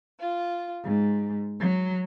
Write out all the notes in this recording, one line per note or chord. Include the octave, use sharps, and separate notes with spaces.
F4
G#2
F#3